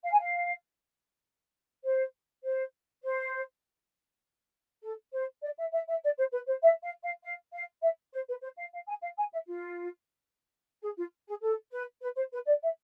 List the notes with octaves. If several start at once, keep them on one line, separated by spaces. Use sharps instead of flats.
F5
G#5
F5
C5
C5
C5
A4
C5
D5
E5
E5
E5
D5
C5
B4
C5
E5
F5
F5
F5
F5
E5
C5
B4
C5
F5
F5
G#5
F5
G#5
E5
F4
G#4
F4
G#4
A4
B4
B4
C5
B4
D5
E5